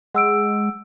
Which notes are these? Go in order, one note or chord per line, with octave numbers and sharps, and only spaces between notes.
G#3 F#5 E6 D7